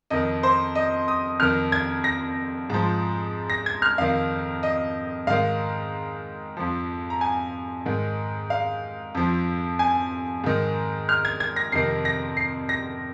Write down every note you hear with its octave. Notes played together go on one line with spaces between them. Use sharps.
F2 D#3 D#5
C5
D#5
D#6
F2 D#3 F6
G#6
A#6
G#2 F3
A#6
G#6
F6
F2 D#3 F5
D#5
G#2 D#3 F5
F2 F3
A#5
G#5
G#2 D#3
F5
F2 F3
G#5
G#2 D#3
F6
G#6
G#6
A#6
F2 C3 D#3 C7
A#6
C7
A#6